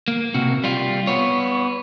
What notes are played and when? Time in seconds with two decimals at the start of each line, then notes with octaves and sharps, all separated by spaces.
0.08 A#3
0.34 C3 F#4
0.64 G3 F4
1.07 B3 C#5